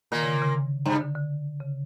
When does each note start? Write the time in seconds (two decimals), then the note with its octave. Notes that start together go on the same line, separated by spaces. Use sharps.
0.12 A#2 D#3 A#3
0.23 C#3
0.26 D3
0.42 C#3
0.86 G2 G3
1.01 D3
1.15 D3
1.60 C#3